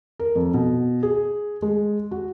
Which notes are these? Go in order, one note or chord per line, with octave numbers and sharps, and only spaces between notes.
A#4
F2
B2
G#4
G#3
F#4